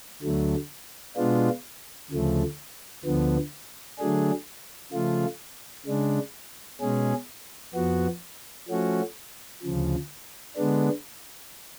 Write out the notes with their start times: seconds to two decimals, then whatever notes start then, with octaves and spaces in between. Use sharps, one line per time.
0.22 D2 D3 F#3 A3
1.16 B2 G#3 B3 D4 F4
2.10 D2 C#3 F3 A3
3.05 D2 D3 F3 B3
3.98 D3 F#3 A3 D4 G#4
4.92 C#3 F3 A3 F4
5.86 C#3 G#3 D4
6.81 B2 G#3 C#4 G#4
7.74 F2 F3 B3 F#4
8.68 F3 A3 C#4 F#4
9.63 D2 C#3 F3
10.56 D3 G#3 B3 D4